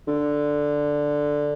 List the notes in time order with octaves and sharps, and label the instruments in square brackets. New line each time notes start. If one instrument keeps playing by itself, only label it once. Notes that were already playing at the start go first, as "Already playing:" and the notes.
[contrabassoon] D3